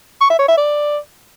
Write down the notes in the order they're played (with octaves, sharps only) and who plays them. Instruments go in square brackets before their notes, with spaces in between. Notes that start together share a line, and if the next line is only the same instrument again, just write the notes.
[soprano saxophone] C#6
E5
C#5
E5
D5